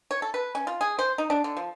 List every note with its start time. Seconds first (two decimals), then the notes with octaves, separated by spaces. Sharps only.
0.11 C#5
0.22 A4
0.34 B4
0.55 C#4
0.67 F4
0.81 G#4
0.99 C5
1.18 D#4
1.30 D4
1.44 D3
1.57 F3